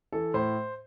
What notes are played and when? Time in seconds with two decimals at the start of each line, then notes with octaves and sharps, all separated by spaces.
0.12 E3 A4
0.34 A2 C5